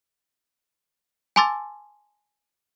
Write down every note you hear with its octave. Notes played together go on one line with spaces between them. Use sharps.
G#5 A5 C6 D6 E6 A6